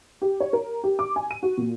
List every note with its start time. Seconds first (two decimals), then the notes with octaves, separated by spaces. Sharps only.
0.22 G4
0.40 C#5
0.53 A#4
0.84 G4
0.99 D6
1.16 G#5
1.31 D#7
1.43 F#4
1.57 A#2